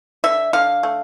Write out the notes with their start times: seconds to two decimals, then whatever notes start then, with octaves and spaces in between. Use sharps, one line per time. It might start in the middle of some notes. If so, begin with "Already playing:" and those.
0.24 D3 E5
0.53 D3 F5
0.83 A3